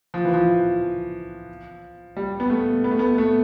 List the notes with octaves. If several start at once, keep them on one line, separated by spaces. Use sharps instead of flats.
F3
E3
F3
G3
B3
A3
B3
A3
B3
A3